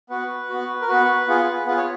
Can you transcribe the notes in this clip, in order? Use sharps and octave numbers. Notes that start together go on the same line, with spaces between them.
B3 F#4 B4
B3 F#4
A#4
B3 F#4 B4
B3 F4 G#4
B3 F4 G#4 B4
C#5